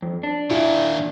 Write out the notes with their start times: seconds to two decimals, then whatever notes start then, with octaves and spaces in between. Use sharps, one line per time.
0.02 F2
0.23 D4
0.51 A#2 D#3 E4